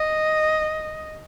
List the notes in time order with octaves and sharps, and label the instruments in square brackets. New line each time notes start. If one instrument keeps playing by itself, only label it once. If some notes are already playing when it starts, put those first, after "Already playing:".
Already playing: [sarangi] D#5